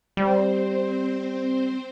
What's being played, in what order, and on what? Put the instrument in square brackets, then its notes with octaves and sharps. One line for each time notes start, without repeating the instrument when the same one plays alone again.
[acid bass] G3 [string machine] C4 C5